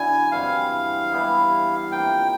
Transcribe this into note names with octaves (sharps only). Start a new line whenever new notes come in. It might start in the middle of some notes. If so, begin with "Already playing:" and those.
Already playing: D3 F#3 B3 E4 G#5
G2 E3 G3 C4 F5
E3 G3 B3 E4
C3 F3 A#3 G5